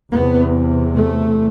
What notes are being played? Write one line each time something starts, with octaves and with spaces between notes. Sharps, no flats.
E2 C3 B3
A3